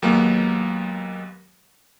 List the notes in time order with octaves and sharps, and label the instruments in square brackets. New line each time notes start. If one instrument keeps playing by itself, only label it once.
[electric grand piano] D#2 F#3 G#3 A#3 B3